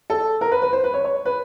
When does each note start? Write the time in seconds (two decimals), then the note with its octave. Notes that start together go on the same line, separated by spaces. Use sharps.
0.10 A4
0.41 A#4
0.52 B4
0.62 B4
0.73 C5
0.84 B4
0.94 C#5
1.04 C#5
1.25 B4